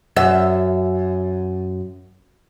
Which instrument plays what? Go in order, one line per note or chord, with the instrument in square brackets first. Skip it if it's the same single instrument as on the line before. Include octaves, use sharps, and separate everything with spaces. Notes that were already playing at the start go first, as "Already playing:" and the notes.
[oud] F#2 E5